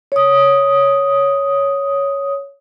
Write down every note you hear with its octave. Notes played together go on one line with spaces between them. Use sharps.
C#5 D#6